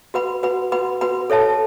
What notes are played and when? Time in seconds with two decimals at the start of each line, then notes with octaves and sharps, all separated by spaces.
0.14 F#4 B4 F#5 B5
0.43 F#4 B4 F#5 B5
0.72 F#4 B4 F#5 B5
1.01 F#4 B4 F#5 B5
1.30 A4 C#5 E5 A5